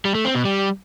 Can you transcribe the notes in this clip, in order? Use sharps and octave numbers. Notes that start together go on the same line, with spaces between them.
G3
A3
C4
B2
G3